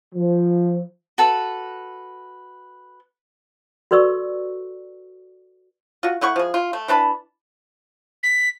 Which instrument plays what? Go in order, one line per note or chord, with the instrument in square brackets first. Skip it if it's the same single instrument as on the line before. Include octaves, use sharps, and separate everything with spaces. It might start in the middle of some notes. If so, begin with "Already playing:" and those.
[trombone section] F3
[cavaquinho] F#4 A4 B4
[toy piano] F#4 A4 B4 D5 C#6 E6
[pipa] F4 F#4
A3 E4 F#5 C#6
F3 G#4
F4
A3
E3 D4 A5 B5
[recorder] B6